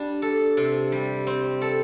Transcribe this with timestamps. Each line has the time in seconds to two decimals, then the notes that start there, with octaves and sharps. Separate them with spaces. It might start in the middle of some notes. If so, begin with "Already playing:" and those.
Already playing: G3 D4
0.22 A4
0.57 C3
0.92 G3
1.27 C4
1.61 A4